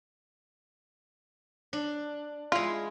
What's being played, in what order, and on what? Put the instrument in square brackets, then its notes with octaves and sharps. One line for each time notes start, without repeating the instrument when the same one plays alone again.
[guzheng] D4
[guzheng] G#3 E4 [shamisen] F4